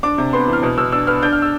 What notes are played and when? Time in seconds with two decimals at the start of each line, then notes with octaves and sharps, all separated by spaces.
0.03 D4 D6
0.18 C3
0.33 B3 C6
0.48 E3
0.53 F6
0.63 B2
0.78 B2 E6
0.92 D4 E6
1.07 B3 F6
1.22 D4 G6
1.32 F6
1.42 E6